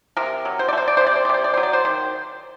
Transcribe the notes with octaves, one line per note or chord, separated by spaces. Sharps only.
C3 A#4
F#3
C5
D5
A3
C5
D5
C3 C5
D5
C5
D5
C3 C5
D5
F#3 C5
D5
C5
D#3 C5